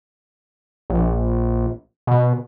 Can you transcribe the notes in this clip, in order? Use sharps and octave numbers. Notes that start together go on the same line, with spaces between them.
A#1
B2